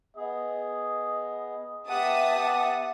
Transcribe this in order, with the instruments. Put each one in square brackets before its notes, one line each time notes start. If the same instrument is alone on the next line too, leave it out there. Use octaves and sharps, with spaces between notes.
[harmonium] B3 G#4 [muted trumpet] D#5
[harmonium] B3 [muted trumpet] G4 [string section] E5 A5 D#6 [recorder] F#5